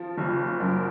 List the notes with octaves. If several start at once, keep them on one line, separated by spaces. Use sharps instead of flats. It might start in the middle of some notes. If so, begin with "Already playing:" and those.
Already playing: F3
F#1
F#2